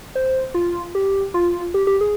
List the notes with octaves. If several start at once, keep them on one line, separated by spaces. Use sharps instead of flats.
C5
F4
G4
F4
G4
G4
G#4